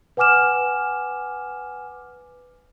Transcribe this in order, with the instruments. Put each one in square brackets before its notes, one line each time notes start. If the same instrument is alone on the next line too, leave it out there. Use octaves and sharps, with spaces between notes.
[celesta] B4 F#5 G#5 D6 F6 E7